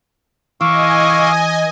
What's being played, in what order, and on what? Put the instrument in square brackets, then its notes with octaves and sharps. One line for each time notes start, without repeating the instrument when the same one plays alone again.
[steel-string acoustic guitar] E3 [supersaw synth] D#5 G#5 [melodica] F5 D6 E6 [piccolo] C#6